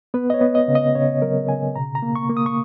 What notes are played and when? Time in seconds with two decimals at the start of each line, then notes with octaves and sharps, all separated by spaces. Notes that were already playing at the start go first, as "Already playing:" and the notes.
0.14 B3 B4
0.30 D#5
0.34 C#5
0.41 B3
0.55 D#5
0.68 C#3
0.75 D#5
0.95 C#3 C#5
1.22 F#3 A#4
1.48 C#3 G#5
1.76 B2 A#5
1.95 A#5
2.02 A#3
2.15 C#6
2.30 A#3
2.37 D#6
2.46 C#6